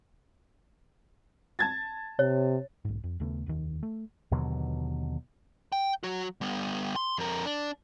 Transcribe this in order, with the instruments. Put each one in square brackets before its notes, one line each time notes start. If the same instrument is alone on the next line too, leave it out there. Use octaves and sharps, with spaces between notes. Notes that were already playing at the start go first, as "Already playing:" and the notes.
[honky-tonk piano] A5 G#6 A6
[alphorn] C3 [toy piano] C#5
[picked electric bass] B1 G#2
F2
D#2 C#3 A3 B3
F1 D#2 D#3
A3
[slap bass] D#2 B2 D3 F#3
[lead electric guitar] G5
F#3 F#4
G3 B3
C6
F2 A#4
D4